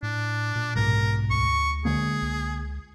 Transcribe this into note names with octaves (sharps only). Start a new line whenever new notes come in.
A2 D4
A#2
B1 G#2 A#4
D2 C#6
D3 G#3 A#3 G#4
C#2